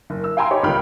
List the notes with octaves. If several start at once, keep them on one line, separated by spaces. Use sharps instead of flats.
F#1
E6
F5 G5 G#5 A#5 C6 E6
D#4 G4 C#5 D#5 B5 D6
G1 C#2 D#3 G5 B5 F6